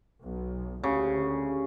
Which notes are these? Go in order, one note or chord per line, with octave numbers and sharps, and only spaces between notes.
B1
D2 C#3 G4